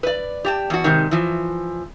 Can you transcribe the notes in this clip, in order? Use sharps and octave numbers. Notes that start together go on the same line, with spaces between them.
B4 D5
G4 G5 A5
E2 F#4
G#2 C3 D#3
E3 F3